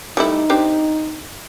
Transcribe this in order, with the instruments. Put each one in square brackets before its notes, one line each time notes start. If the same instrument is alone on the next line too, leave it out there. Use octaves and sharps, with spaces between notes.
[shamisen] G3 A3 E4 [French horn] D#4
[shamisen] C4 D4 G4